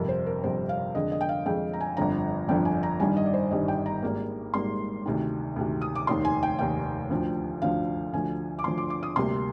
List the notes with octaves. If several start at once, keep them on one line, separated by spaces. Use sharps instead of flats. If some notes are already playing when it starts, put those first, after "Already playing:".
Already playing: G1 F2 C3 A#4
C5
A#4
G1 F2 C3 C5
F5
F2 D3 G#3 D#5
D#5
G5
F5
F2 D3 G#3 G5
A#5
G#5
G1 F2 D3 F3 A#5
G1 F2 D3 F3 G5
G#5
A#5
G1 G2 D#3 G3 G#5
D#5
D5
C5
G1 G2 D#3 G3 D#5
G5
A#5
G#1 G#2 G3 A#3
G#1 G#2 G3 A#3 C6
D2 C3 D#3
D2 C3 D#3
D#6
D6
F1 D#2 D#3 C6
G#5
G5
F1 D#2 D#3 G5
D2 D3 F3
D2 D3 F3 F5
D2 D3 F3 G#5
D6
D2 D3 F3 C6
D6
D6
D#6
D2 C3 G3 A#3 C6